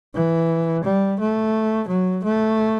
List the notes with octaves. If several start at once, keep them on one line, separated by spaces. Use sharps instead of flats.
E3
G3
A3
F#3
A3